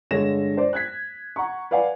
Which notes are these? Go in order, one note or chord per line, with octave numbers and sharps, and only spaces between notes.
G2 D3 G#3 C#5 A#6 E7
C5 D5
F#6 G#6 B6
F#5 A#5 C#6
B4 D5 F5 F#5 G#5